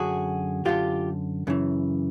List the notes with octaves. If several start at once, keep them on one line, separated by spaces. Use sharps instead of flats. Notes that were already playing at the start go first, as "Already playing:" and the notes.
Already playing: F#2 D3 F#4 G#4
F#2 D3 F4 G4
F#2 C#3 E3